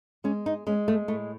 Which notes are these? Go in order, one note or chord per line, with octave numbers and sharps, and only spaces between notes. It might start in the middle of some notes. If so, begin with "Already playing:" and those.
G#3 C#4
D#4
G#3 C#4
A3
A2 A3